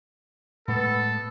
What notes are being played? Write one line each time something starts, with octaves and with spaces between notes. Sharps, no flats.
A2 G#3 B3 A4